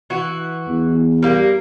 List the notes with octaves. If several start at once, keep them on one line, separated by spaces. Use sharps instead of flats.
E3 F#4
E2
G3 A#3